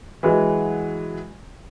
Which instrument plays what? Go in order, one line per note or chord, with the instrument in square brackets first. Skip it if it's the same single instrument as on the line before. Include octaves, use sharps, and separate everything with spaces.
[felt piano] E3 F#3 G#3